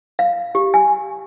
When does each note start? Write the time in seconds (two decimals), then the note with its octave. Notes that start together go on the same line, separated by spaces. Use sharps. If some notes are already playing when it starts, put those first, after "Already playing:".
0.19 F5
0.55 G4
0.74 G#5